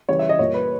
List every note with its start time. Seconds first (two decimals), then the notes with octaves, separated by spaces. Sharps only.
0.08 C#3 E3 G3 C#5
0.19 E5
0.29 D#5
0.39 A#2 G3 C#5
0.54 B4